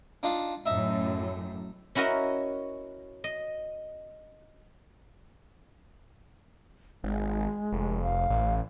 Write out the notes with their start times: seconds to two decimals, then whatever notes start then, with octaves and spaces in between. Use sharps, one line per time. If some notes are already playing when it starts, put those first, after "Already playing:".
0.23 D4 D#4 F4
0.66 F#2 A2 D#4 E5
1.95 C#4 E4 F#4 A#4 D#5
3.24 D#5
7.04 G#1 G#3
7.72 F1
8.03 F5
8.30 A1